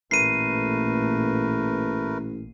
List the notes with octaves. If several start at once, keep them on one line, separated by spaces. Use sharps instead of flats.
A1 A#2 A3 A#4 B4 C7 D#7